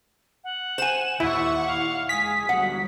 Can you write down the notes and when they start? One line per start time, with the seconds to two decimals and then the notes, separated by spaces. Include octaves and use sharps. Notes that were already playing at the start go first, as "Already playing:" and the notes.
0.44 F#5
0.78 C5 G#5 E7
1.20 D#2 A#2 E4 E5 F#5 C#6
1.67 F5
2.09 G#3 G#5 D#6 B6
2.49 G1 F#3 F#5